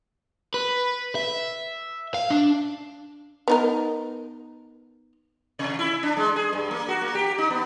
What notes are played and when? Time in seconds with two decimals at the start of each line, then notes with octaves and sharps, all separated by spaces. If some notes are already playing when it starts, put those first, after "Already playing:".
0.54 B4
1.15 E5
2.14 F5
2.30 D4
3.48 B3 D#4 A#4
5.59 C3
5.79 E4
6.03 D4
6.17 G#3
6.36 G#4
6.53 G2
6.71 A#3
6.88 F#4
7.01 A#3
7.15 G4
7.38 D#4
7.50 B3